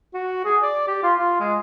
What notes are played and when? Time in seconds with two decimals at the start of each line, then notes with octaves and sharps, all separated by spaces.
0.14 F#4
0.45 G#4
0.63 D5
0.88 G4
1.03 F4
1.19 F4
1.40 G#3